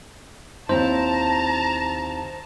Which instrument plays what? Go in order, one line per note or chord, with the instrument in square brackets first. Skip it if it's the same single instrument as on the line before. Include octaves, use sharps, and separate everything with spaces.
[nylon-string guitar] D#2 C4 E4 [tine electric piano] C5 [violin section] A5 [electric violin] A#5